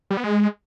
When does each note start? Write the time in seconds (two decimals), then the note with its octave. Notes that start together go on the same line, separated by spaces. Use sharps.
0.11 G3
0.17 B3
0.24 G#3